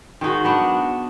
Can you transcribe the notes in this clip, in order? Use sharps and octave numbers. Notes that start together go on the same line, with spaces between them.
D#3 G#3 D#4 F#4
B3 D4